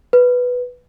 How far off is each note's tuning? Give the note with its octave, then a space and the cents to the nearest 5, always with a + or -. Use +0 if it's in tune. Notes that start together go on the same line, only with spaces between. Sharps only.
B4 +0